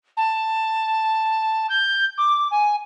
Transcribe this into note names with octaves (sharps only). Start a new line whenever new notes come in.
A5
G6
D6
G#5